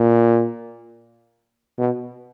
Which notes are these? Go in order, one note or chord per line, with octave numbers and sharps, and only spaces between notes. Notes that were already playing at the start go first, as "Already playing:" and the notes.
Already playing: A#2
B2